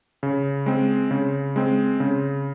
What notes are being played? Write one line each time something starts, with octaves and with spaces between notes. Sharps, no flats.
C#3
G#3 C4
C#3
G#3 C4
C#3